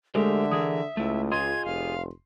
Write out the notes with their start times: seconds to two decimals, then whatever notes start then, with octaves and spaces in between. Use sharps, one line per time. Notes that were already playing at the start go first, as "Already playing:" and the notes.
0.15 D3 G#3 A3 G4 A#4 C5 E5
0.51 E3 G#4 A#4 D#6
0.97 C#2 A3 E4
1.32 F4 G#4 D#5 C6 G#6
1.65 F1 F5